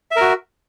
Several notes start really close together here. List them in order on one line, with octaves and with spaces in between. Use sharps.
E5 A#4 F#4